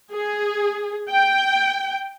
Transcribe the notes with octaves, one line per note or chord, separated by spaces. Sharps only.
G#4
G5